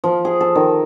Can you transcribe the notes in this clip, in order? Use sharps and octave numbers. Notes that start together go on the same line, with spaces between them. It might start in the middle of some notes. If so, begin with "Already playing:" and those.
F3
G#4
A4
D#3